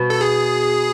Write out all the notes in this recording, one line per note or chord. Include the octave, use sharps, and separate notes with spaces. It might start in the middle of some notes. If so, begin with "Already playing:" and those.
Already playing: B2
A4
G#4